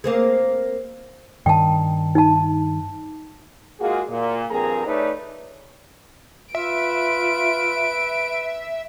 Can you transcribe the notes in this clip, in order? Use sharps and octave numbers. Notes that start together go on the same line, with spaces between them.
A#3 C4 G#4
G2 D#3 G5 A5
D#4 A5
G#3 A#3 F4 F#4 G#4
A#2
G2 F3 C4 G#4 A#4 A#5
A3 D#4 B4 C#5 D5
F4 B4 E5 D7